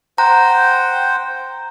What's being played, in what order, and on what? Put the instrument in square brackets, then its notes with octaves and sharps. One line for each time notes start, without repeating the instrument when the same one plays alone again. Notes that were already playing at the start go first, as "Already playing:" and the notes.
[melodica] C5 F#5 G5 [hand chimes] A#5